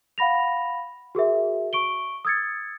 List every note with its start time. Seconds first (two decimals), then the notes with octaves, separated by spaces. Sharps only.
0.18 F5 F#5 B5 A#6 F7
1.15 F#4 G#4 A#4 E5
1.73 C#6 D7 G7
2.25 D#6 E6 G#6 A6 C#7